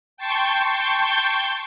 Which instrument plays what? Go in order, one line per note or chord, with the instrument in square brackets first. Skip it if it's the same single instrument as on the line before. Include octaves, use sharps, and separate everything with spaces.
[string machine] G5 A5 C6 C#6 G6